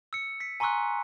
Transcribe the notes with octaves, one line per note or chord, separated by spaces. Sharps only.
E6 C#7
B6 C#7
G#5 A#5 C6 C#6 E6 F#6